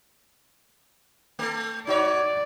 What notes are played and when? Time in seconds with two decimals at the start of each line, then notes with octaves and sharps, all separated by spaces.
1.39 A3 A4
1.87 D#4 F#4 C#5 D5